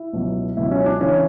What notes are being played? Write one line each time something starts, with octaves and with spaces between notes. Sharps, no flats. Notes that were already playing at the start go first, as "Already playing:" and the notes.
Already playing: E4
C#2 B2 F#3
C#2 B2 F#3 E4
C#4
D4
C#3 E3 C#4